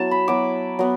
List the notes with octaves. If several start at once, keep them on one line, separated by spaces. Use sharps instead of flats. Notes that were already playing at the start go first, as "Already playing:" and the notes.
Already playing: F#3 B3 E4 A5
B5
F#3 B3 E4 D6
F#3 B3